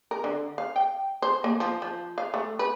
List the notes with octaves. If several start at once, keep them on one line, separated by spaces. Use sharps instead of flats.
A#4
D3
F5
G5
C5
A#3
F3
F3
F5
A3
B4